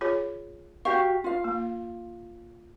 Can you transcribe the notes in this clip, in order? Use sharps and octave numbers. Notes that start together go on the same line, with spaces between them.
F4 G#4 C#5
F#4 G4 F5 C#6
F4 F5
A#3